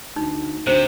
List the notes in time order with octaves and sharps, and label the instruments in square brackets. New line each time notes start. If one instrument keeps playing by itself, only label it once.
[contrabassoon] D2 [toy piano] D#4
[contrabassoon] D2 [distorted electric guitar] C3 [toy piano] C5